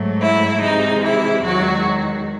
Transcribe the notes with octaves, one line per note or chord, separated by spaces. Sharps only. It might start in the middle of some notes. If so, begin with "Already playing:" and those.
Already playing: G#2 F#3 A3
E4
C3 E3 G#3 D#4
E4
E2 D#3 F#3 G#3 F#4